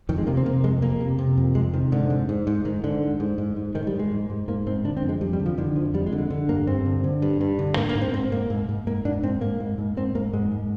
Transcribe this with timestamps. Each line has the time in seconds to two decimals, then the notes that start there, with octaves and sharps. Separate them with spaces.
0.09 F2 D#3
0.18 G#3
0.27 C3 A#3
0.37 C4
0.46 C3 A#3
0.64 F2 G#3
0.82 F2 A#3
1.01 C3
1.19 C3
1.37 F2
1.55 F2 G#3
1.73 C3 D#3
1.92 G#2 D3
2.10 G#2
2.29 G#2
2.47 G#2
2.65 G#2 D#3
2.84 G#2 D3
3.02 G#2
3.20 G#2
3.38 G#2
3.56 G#2
3.75 G#2 D#3
3.87 G3
3.93 G#2
3.99 G#3
4.12 G#2
4.30 G#2
4.48 G#2 A#3
4.67 G#2 C4
4.85 D3 D4
4.97 C4
5.02 F2
5.09 G#3
5.21 F2 G3
5.33 G3
5.40 D3
5.46 F3
5.58 D3 D#3
5.76 F2 F3
5.94 F2 G3
6.06 G#3
6.13 D3
6.18 G#3
6.30 D3
6.49 G2 A#3
6.67 G2 C4
6.86 D3
7.04 D3
7.22 G2
7.41 G2
7.59 D3
7.77 G#2 A#3
7.89 A#3
7.95 G#2
8.02 C4
8.14 G#2 C4
8.32 G#2 A#3
8.50 G#2
8.69 G#2
8.87 G#2 A#3
9.05 G#2 D4
9.23 G#2 C4
9.41 G#2 A#3
9.60 G#2
9.78 G#2
9.97 G#2 C4
10.15 G#2 A#3
10.33 G#2 G#3
10.52 G#2